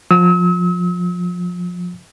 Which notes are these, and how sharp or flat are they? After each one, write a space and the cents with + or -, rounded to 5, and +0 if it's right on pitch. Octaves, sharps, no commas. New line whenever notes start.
F3 +25 E6 -45